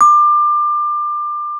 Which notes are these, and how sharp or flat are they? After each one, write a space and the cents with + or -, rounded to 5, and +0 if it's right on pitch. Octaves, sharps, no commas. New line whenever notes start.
D6 +25